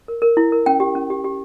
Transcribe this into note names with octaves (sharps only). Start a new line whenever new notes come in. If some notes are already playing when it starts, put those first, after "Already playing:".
A#4
A#4
E4
A#4
C#4 G5
G4
C#4
G4
G4